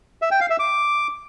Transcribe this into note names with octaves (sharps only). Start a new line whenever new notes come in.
E5
G5
F5
E5
D6